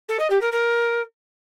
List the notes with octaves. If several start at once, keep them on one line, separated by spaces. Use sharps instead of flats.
A4
D#5
G4
A#4
A#4